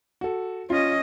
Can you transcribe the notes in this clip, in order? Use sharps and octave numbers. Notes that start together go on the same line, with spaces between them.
F#4 A4
C#4 F4 D#5